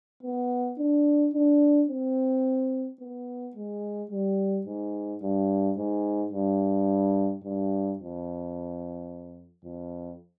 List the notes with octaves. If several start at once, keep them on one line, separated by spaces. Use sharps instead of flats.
B3
D4
D4
C4
B3
G#3
G3
G#2
G2
G#2
G2
G2
F2
F2